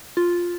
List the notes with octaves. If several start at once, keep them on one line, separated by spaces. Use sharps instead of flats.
F4